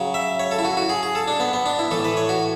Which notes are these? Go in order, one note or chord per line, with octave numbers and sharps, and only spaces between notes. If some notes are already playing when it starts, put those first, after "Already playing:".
Already playing: C#3 F#3
E5
C#5
A4
E4
F#4
F#4
G#4
G#4
A4
D4
B3
B3
D4
E4
A2 E3 A4
B4
C#5
F#4